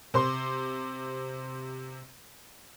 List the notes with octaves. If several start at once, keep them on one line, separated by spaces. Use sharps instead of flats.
C3 C5 C6